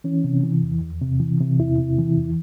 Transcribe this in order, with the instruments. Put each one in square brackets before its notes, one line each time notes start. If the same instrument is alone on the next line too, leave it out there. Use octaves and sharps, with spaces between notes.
[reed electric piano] E3 C#4
C3
E3
E2
E2
C3
E3
C3
E2 E4
C3
E3
E2